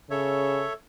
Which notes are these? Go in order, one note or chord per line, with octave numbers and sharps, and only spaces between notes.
C#3 A4 C#5 E5